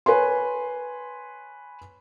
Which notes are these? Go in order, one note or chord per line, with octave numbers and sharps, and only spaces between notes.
B4 C#5 G#5 C6